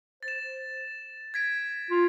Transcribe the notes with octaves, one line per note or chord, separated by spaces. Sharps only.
C5 A6
E7
G#6 B6 D7
F4